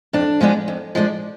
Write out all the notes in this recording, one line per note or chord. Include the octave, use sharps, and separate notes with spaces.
F2 D4
F3 G#3 B3 D4
F2
F3 G#3 B3 D4